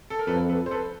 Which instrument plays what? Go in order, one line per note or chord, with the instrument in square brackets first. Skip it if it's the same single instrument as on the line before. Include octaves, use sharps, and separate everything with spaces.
[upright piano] A4
A#4
[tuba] F2 [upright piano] A4 B4
[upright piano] A4 B4
C5
A4 B4